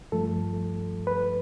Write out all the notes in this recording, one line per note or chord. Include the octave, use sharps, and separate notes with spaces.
G2 F3 A3 A4
B4